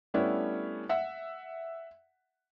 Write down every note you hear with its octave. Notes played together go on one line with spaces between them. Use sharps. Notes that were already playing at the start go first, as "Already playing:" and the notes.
G3 A3 B3 C#4 D4 E4
E5 F#5